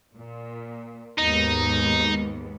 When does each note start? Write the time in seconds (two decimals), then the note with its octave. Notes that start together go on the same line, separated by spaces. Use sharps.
0.16 A#2
1.18 D#2 G#2 B3 D#4